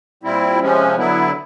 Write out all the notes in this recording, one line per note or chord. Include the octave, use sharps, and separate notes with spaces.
A#2 G3 C4 E4
C3 F3 G#3 C#4
D3 F#3 B3 E4